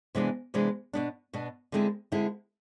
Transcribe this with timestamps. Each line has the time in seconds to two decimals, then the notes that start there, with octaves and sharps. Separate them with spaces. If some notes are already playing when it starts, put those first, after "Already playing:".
0.15 C3 E3 G#3 B3 D4
0.54 C3 E3 G#3 B3 D4
0.93 B2 B3 D4
1.34 B2 B3 D4
1.72 D3 G#3 C4 E4
2.12 D3 G#3 C4 E4